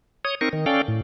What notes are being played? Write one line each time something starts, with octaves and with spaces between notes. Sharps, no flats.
C#5 D#6
C4 D#4 A#4 C#6
D#3
C#4 A4 D5 F5 G5
A2